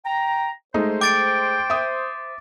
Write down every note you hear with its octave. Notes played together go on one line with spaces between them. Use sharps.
G5 A#5
G#3 A3 D#4 C5
G5 D6 A6 D7
E5 D#6